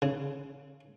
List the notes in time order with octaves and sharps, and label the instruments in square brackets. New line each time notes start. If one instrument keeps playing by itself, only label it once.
[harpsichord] C#3